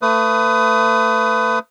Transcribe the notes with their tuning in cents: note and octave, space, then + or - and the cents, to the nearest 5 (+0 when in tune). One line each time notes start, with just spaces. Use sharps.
A3 +35 B4 +30 D#6 +0